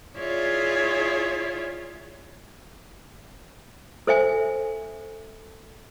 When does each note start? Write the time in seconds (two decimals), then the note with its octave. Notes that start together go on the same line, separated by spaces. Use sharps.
0.17 E4 F4 G#4 C#5 D5 E5
4.07 A4 C5 E5 G#5